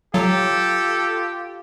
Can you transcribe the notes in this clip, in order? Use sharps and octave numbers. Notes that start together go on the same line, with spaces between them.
F#3 F4 G4 A4